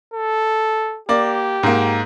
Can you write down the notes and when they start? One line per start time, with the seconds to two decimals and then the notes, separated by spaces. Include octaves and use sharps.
0.14 A4
1.09 A#3 G4 D5
1.63 G#2 A#3